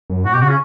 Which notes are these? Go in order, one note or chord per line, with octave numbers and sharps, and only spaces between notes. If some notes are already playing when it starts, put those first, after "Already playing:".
F#2
A2 F#4
B2 G4
C#3 F#4
C#4